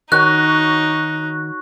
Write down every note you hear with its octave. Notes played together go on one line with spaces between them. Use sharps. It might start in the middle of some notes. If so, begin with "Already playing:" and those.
D#3 D#4 F#4 C#5 F#6